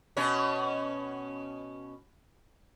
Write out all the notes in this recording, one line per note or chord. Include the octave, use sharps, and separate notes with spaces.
B2 C#4